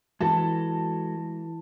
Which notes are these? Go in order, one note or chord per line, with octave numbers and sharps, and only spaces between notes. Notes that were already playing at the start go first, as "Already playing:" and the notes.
E3 G#3 F#4 A4 A5